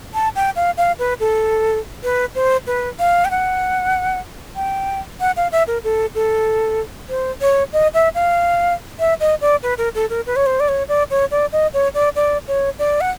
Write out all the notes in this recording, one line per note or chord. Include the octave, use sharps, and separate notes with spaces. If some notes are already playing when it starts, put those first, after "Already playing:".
A5
G5
F5
F5
B4
A4
B4
C5
B4
F5
G5
F#5
G5
F#5
F5
E5
A#4
A4
A4
C5
C#5
D#5
E5
F5
E5
D#5
D5
B4
A#4
A4
A#4
B4
C#5
C5
D5
C#5
D5
C#5
D5
D#5
C#5
D5
D5
C#5
D5
F#5